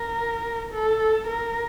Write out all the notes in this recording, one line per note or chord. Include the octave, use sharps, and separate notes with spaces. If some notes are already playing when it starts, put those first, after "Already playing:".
Already playing: A#4
A4
A#4